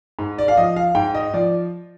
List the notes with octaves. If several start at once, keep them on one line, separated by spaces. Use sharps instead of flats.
G#2
D5
F5
F3 D#5
F5
G#2 G5
D#5
F3 D5